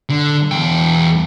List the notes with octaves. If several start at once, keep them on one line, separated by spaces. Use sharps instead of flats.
D3
E2 G5